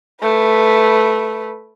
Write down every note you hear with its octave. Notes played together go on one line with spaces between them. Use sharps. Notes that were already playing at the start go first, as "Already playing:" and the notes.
A3 B4